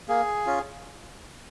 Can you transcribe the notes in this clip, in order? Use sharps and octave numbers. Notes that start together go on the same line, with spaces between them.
A#3 G#4
C#4 F4